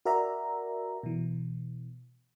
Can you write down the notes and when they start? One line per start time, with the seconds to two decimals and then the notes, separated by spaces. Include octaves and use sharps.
0.05 F#4 A#4 D5 E5 A#5
1.03 B2 E3